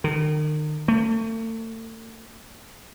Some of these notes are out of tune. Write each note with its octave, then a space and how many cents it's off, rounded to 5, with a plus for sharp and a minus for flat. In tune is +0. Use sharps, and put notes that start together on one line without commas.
D#3 -40
A3 +35